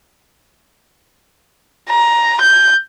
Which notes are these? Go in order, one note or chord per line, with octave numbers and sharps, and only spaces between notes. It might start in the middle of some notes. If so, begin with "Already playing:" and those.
A#5
G6